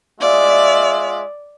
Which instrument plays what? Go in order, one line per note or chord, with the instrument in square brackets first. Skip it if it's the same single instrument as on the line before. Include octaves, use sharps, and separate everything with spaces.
[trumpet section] G#3 F4 E5 [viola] D5